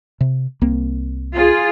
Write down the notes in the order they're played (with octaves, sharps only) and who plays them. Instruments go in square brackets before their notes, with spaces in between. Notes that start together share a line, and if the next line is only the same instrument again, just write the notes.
[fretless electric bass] C3
C2 A#3 C4
[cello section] F4 G#4